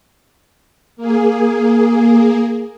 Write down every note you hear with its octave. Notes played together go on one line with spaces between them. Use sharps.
A#3 G#4